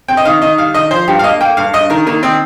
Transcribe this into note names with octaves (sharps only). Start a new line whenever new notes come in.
C4 G5
D#5
D#3 F5
D#3 D#5
G3 F5
D#3 D#5
F3 C5
G2 G4
F5
A#3 D#5
A#3 G5
G2 F5
G2 D#5
D#3 A#4
D#3 A#3
D#3 C4